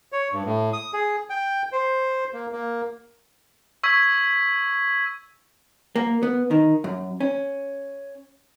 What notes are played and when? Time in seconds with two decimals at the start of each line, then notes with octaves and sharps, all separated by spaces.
0.12 C#5
0.33 G2
0.45 A2
0.73 D#6
0.93 G#4
1.30 G5
1.72 C5
2.33 A#3
2.52 A#3
3.83 C#6 E6 G#6 B6
5.96 A#3
6.23 B3
6.51 D#3
6.84 F#2
7.21 C#4